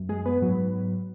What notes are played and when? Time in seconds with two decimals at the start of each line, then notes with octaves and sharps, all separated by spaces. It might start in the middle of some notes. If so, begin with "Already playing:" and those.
Already playing: F#2
0.09 G#3 G#4
0.25 B3 B4
0.42 G#2 F#3